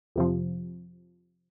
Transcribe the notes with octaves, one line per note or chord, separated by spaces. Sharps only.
F2 C3 F3